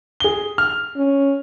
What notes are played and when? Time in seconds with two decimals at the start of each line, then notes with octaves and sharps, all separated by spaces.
0.20 G#4 G7
0.58 F6
0.96 C#4